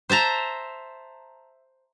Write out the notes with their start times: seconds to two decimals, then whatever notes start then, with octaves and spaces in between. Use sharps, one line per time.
0.10 C5 E5 A5 A#5